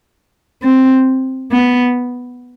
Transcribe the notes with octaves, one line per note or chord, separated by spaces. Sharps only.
C4
B3